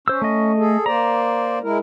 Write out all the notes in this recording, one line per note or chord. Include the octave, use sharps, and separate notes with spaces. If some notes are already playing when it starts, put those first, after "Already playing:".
C#4 C5 E6
A3 D#5
G#4 A4
A#3 C5 D5 A#5
G#3 E4 A#4